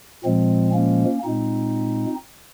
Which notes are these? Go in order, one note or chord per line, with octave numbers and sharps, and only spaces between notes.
A#2 F3 G#3 C4
A#3 C#4
A#2 G#3 C4 D#4